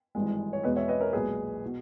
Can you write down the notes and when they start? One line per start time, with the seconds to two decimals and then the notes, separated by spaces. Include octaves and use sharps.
0.15 G#1 G2 E3 G#3
0.53 C#5
0.63 E2 B2 G#3 B4 D#5
0.76 C#5 E5
0.88 B4 D#5
1.01 A#4 C#5
1.13 B1 A#2 G#3 G#4 B4
1.65 B2